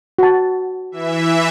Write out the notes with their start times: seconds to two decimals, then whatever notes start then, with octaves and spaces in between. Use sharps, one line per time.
0.19 F#4 A5
0.92 E3 E5